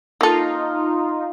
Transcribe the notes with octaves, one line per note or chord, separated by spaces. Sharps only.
A#3 D#4 F4 A4